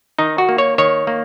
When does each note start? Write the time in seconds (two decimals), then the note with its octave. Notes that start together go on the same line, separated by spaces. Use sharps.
0.19 D#3 D#4
0.38 F#4
0.49 A#3
0.58 C#5
0.78 D#3 C#5
1.07 A#3